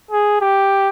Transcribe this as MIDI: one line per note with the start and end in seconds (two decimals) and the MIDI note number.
0.11 0.39 68
0.41 0.89 67